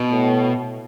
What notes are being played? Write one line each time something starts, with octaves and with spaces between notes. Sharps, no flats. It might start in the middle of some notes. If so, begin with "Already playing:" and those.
Already playing: B2
A2